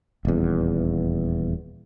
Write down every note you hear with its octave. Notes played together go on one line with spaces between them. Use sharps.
D#1 E2